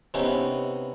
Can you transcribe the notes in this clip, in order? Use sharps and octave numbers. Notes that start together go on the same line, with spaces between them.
C3 B3 C#4 D#4 E4 G#4